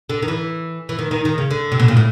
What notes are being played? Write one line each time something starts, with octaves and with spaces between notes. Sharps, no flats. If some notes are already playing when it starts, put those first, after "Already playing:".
D3
D#3
E3
E3
D#3
D#3
D#3
C#3
D3
C3
B2
A#2
A2